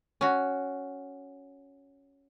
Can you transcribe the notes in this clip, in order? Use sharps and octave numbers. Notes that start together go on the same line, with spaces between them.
C#4 F#4